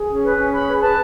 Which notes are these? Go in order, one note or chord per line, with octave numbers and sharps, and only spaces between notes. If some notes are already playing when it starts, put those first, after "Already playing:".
Already playing: G#4
C#4
B4
C#4
G#4 B5
B4
B4 A5